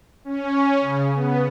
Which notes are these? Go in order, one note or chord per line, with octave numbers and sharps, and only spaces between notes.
C#4
C#3
B3